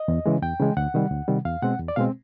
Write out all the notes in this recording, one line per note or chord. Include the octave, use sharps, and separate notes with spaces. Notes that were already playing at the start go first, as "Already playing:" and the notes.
Already playing: D#5
E2
C#3 E3 G#3
E2 G5
C#3 E3 G#3
D2 F#5
C3 D#3 G3
D2
C3 D#3 G3
E2 F5
B2 G#3 C4 F#5
E2
D5
B2 G#3 C4 F5